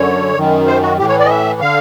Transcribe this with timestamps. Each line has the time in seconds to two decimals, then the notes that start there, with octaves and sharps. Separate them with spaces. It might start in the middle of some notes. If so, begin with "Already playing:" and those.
Already playing: F#2 D3 C#5
0.36 F#2 D#3
0.67 C5
0.82 F#4
0.98 A2 G4
1.02 E3
1.09 C#5
1.19 D5
1.25 D#5
1.30 E5
1.61 D3 F5